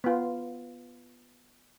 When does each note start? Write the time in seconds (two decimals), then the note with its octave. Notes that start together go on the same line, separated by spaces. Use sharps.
0.04 B3 F4